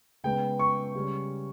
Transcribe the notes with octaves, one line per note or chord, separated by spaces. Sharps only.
C#3 G#3 B3 G5
C#6
C#3 G3 C#4